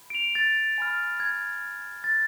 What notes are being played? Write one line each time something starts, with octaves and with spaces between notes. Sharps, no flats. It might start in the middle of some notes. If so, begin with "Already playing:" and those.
Already playing: B5
D7
F7
A6
G#5 B5 F6
G#6
A6